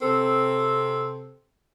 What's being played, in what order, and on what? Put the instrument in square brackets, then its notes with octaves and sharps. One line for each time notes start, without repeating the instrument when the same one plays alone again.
[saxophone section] C3 C4 A4